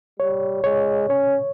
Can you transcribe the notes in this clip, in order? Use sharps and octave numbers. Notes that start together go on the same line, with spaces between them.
G3 C#5
G#3 C#5
C#4 C#5